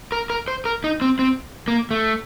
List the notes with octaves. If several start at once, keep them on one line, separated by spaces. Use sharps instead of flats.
A#4
A#4
C5
A#4
D#4
C4
C4
A#3
A3